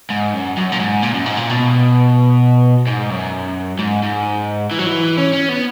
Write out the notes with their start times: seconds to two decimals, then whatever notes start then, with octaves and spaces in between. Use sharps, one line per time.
0.10 G#2
0.34 F#2
0.57 F#2
0.72 A#2
0.80 G#2
1.03 A#2
1.14 F#2
1.26 G#2
1.37 A#2
1.49 B2
2.87 G#2
3.10 F#2
3.79 G#2
4.03 G#2
4.71 E3
4.79 F#3
4.87 E3
5.17 C#4
5.33 C#4
5.49 B3